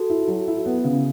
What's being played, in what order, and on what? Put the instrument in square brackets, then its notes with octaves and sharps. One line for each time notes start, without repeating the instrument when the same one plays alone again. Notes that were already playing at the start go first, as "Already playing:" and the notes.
Already playing: [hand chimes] F#4 A4
[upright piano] E4
F#3
E4
B3
C#3